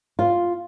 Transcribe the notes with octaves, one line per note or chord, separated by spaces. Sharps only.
F4